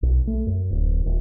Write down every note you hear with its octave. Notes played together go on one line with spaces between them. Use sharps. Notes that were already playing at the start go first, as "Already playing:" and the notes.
B1
A3
F#2
D1
D#1